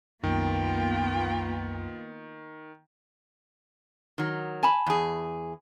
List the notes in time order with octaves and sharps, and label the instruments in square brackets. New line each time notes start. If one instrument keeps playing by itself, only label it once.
[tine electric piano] C2 F#2 [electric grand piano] D#3 [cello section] A#3 B3 F4 [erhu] G5
[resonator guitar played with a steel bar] D#3 F#3
[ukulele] G#5 A5 B5
[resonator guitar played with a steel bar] E2 G#4